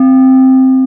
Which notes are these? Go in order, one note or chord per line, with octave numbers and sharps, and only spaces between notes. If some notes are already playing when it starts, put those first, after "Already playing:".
Already playing: C4